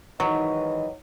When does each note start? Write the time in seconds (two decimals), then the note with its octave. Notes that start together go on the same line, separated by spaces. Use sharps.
0.20 G#2 D#3 E3 F#3 B4 D#5